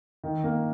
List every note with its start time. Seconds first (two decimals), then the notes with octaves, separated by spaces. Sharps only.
0.24 D#3
0.44 A#3